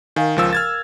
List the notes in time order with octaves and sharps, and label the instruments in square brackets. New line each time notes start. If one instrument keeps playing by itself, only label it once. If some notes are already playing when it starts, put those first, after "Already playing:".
[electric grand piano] D#3 [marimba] A#4 F5 G#5
[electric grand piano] C#2 F3 E6
F6 G#6 A6